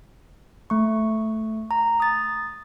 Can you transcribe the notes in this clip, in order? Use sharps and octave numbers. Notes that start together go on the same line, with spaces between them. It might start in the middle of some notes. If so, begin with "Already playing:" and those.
A3 C#6
A#5
D#6 A6